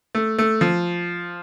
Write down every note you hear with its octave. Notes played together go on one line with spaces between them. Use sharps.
A3
A3
F3